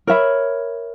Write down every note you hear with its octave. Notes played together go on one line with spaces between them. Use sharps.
A#4 C#5 E5 B5